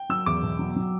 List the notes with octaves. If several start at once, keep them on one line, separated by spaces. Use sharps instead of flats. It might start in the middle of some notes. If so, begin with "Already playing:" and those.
Already playing: G5
F#3 E6
E2 D6
B2
F#3
F#3